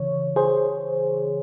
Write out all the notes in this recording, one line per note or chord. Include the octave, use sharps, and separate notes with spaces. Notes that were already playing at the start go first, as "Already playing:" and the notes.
Already playing: C#3 E3 C#5
G#4 C5